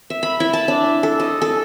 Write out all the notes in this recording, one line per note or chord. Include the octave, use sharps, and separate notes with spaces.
E5
B5
E4
A5
D4
A4
D#5
A4